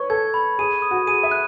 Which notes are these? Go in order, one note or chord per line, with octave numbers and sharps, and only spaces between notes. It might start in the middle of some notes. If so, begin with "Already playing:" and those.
Already playing: B4 C#5 C#6
A4 G#6
B5
G#4 D#7
D#6
F#4
G#4 D#7
E5
F#6